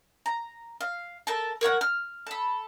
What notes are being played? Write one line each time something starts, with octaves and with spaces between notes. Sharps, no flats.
A#5
F5
A4 A#4 A5
A#4 C#5 F5 F#5
F6
A4 B5